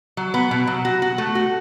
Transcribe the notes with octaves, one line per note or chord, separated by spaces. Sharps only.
F#3
B3
B2
F#3
F#4
F#4
A3
F#4